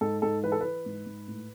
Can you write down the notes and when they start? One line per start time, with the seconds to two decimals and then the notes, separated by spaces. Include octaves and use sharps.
0.01 G#2 A4
0.22 G#2 A4
0.43 E3 B4
0.52 A4
0.61 E3 B4
0.86 G#2
1.06 G#2
1.28 A2